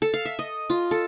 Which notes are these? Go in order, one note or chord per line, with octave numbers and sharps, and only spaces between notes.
A4
F5
E5
D#5
F4
A4